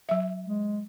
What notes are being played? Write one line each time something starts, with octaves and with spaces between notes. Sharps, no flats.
F#3 E5
G#3